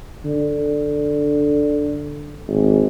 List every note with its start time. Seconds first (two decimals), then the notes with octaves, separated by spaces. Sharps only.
0.25 D3
2.47 G#1